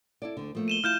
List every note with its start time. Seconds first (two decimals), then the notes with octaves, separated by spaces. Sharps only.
0.22 E4 A4 D5
0.37 D2 D3
0.55 F3 A3 A#3
0.68 D#7 E7 G7
0.84 E4 F4 F6 G6 E7